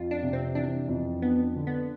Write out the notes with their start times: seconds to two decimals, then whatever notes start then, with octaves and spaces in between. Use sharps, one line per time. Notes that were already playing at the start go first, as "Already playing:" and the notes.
Already playing: F2 F4
0.11 D4
0.22 C3
0.33 C4
0.55 E3 D4
0.88 F2
1.22 B3 D4
1.56 D3
1.67 B3